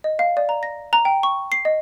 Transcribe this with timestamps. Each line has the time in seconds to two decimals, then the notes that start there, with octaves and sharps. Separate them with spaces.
0.04 D#5
0.19 F5
0.37 D5
0.49 A#5
0.63 A#6
0.93 A#5
1.05 G5
1.23 C#6
1.52 C7
1.65 D#5